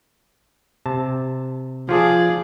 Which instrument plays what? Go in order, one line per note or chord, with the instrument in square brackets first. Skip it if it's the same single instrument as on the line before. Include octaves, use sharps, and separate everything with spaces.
[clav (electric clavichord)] C3 A5
[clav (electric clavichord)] F3 F4 A5 [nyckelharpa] G#4 D5